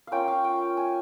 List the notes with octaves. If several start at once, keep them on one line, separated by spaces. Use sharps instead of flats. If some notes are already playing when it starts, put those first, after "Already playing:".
A#3 C#4 F4 F5 G5
F5
G5
G#5